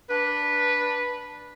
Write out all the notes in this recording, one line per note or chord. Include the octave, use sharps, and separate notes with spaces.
D4 B4